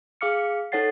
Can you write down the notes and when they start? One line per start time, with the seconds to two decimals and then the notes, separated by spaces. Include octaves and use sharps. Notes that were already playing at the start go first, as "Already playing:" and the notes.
0.21 G#4 F5 D6 F6 C#7
0.72 D#4 A4 C#5 F#5 A6 C7